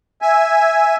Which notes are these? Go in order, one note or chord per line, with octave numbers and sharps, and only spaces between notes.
E5 G#5